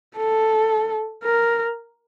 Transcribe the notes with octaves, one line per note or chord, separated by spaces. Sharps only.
A4
A#4